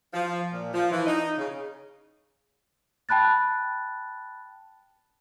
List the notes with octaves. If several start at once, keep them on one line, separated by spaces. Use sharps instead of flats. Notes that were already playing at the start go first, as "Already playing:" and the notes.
F3
A#2
F3
E3
D#4
C#3
G5 A5 B5 F#6 A6